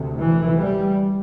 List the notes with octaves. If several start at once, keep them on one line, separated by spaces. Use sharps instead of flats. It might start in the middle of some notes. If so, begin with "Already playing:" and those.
Already playing: D2 C3
E3
G3